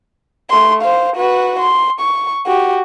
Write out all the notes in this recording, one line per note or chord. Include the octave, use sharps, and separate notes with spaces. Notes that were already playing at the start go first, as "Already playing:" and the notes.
A3 C6
C5 F5
F#4 B4
C6
C#6
F#4 G4